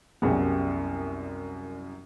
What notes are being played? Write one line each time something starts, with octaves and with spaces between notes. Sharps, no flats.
C2 F#2 G3 G#3 B3